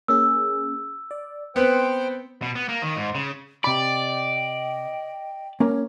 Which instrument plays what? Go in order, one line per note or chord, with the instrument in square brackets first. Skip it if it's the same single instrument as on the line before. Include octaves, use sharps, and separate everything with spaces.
[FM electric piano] A#3 C#4 G#4 [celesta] E6
[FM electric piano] D5
[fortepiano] B3 C4 B4 [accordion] C5 G5 [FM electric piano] C#7
[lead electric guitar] B2
B3
A#3
D#3
G#2
C#3
[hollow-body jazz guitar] C3 B5 [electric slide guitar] D5 [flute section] D#5 G5
[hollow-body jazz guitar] A#3 C#4 A#4 [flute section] C#5